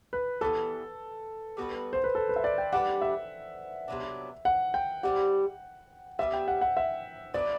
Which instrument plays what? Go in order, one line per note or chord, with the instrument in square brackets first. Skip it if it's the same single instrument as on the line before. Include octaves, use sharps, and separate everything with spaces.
[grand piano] B4
[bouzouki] E3 G3 B3 [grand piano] A4
[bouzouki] G3 B3 F#4 B4
[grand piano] C5
B4
A4
B4
E5
D5
G5
[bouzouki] G3 D4 G4 B4 [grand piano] F#5
[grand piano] E5
[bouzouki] C3 F#3 B3 D4
[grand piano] F#5
G5
[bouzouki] G3 C4 E4 G4 [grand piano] F#5
[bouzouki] G3 B3 D4 G4 [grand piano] E5
[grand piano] G5
F#5
F#5
E5
[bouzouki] F#3 B3 D4 [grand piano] D5